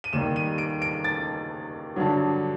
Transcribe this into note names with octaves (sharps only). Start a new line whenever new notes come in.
D#7
D#2 D#3 G3 E7
D#7
D7
D7
A6
G2 D3 F#3